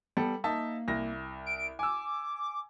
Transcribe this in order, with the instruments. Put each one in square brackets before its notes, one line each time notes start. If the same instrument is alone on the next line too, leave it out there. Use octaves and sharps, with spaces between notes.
[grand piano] G3 A4 [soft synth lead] B3
[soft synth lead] A#3 [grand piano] D#4 E5 A5
[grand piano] C2 A#6
[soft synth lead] D7
[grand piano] G#5 E6 [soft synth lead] D6